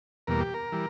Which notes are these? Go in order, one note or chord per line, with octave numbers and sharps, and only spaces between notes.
E2 B2 G3 A#3 A#4
G4
A#4
E3 G3